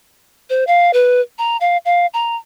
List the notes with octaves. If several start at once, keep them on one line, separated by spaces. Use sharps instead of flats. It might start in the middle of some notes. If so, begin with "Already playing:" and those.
C5
F5
B4
A#5
F5
F5
A#5